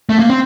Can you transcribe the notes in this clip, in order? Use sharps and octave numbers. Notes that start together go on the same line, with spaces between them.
A3
A#3
C4